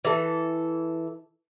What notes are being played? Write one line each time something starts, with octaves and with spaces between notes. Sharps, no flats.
E3 A4